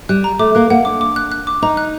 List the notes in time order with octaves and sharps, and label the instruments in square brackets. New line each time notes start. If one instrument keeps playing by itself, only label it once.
[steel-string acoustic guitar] G3 [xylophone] F#6
[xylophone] A#5
[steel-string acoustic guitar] A3 [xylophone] D6
[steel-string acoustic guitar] A#3 [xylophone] F#6
[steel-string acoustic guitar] A#3 [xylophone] F#5
[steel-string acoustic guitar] D4 [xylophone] D6
[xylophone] D6
F#6
F#6
D6
[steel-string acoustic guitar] D#4 [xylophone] A#5
[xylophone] F#6